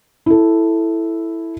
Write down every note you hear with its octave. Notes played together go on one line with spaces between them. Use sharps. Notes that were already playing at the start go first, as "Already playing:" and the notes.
E4 A4